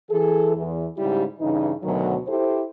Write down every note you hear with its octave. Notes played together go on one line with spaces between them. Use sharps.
E3 G#4 A4
E2
G#2 C#3 G3 E4 G4
G2 C#3 E3 D#4
D2 B2 D#3 F#3
E4 G4 A4 C5